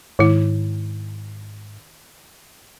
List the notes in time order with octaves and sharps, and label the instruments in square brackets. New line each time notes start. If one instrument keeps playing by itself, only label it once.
[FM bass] G#2 [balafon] D#3 E4